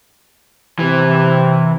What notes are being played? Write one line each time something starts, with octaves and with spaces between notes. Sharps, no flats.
C3 E3